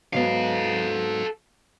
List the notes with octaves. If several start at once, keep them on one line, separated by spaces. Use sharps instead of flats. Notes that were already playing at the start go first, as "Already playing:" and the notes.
G#2 F#3 B3 A4 F5